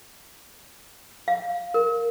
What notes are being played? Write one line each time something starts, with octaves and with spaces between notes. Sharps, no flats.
F5
A#4